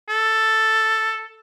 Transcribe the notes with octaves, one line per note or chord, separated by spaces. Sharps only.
A4